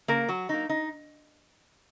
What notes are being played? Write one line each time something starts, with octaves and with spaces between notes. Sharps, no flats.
C#3 A#3 A#4
F#3 F#4
F#3 A#3 D#4
D#4